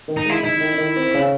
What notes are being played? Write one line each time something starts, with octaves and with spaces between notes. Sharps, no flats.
D#3
D#4
G#3 E4
D#4 E4
D#3
D#3
C4
C#3